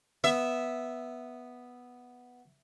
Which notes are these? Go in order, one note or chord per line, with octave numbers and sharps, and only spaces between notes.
B3 E5